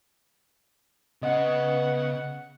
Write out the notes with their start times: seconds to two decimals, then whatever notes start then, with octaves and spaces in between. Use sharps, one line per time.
1.23 C#3 B3 D#5 F#5